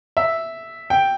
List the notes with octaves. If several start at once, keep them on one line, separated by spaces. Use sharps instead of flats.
E5
G5